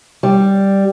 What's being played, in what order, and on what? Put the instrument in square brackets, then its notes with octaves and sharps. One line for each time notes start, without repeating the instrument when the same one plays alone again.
[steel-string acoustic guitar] G3